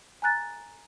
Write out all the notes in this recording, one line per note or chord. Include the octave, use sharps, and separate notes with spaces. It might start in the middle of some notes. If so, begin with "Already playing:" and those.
G#5 A#5 F#6 A6